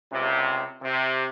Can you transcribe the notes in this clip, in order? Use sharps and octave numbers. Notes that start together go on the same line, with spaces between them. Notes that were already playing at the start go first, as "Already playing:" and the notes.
C#2 C3
C3